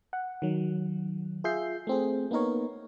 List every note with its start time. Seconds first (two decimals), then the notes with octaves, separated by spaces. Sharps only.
0.13 F#5
0.42 D#3 F#3
1.44 F4 G#4 E5 G6 C7
1.87 A3 C4 G#4
2.31 A#3 B3 D#4 A#4 C#5